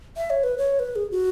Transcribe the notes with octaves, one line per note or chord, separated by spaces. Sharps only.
E5
C#5
B4
C#5
B4
G#4
F#4